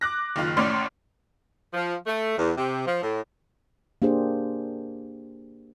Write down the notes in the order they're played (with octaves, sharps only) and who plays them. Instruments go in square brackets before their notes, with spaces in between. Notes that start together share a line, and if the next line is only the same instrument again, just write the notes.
[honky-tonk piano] D6 F#6 A#6
F#1 D#3 F4 F6
A1 A2 C#4 D5 C6 F6
[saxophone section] F3
A3
E2
C3
F3
A2
[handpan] A#3 D4 G4 G#4 C5